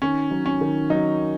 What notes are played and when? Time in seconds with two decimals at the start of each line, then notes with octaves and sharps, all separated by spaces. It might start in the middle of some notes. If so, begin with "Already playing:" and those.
0.02 D#3 C#4
0.31 F#3
0.46 C#4
0.61 D#3
0.90 F#3 D#4